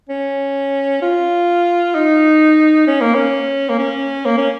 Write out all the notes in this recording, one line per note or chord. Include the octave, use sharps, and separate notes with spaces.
C#4
F4
D#4
C#4
A#3
C#4
A#3
C#4
A#3
C#4